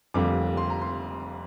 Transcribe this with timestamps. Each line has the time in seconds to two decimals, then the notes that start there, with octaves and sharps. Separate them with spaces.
0.14 F1 F2 D3 G3 A#3 D6
0.57 C6
0.70 A#5
0.82 C6